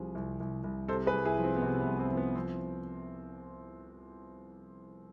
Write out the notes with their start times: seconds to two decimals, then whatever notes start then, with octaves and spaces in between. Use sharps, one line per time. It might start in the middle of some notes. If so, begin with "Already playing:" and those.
Already playing: C2 C3 F3 G#4
0.15 C2
0.40 C2
0.64 C2
0.88 C3 A4 C5
1.06 G#4 B4
1.13 C2
1.25 E4 G#4
1.38 F3
1.44 C4
1.57 B3
1.62 C3 C4
1.81 B3
1.87 C2
1.99 C4
2.11 F3
2.17 B3
2.36 F3 C4